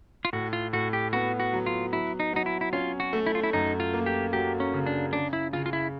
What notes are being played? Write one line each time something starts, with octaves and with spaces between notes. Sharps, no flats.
F4
A2 F#4
F4
A2 F#4
G4
B3 F#4
F#4
F#3
F4
F#3 E4
D#4
F#3 D#4
E4
E4
C#4 F4
F#4
A3
E4
F4
E4
F#2 D#4
F4
A#3
G4
F#3 G4
C#4
C#3
D4
C#3 D4
E4
C#3 F4
F4
E4